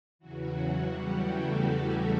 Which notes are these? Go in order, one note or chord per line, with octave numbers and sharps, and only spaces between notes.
E2 C#3 E3 F#3 F#4
G3 G4
A3 A4
A3 A4
A3 A4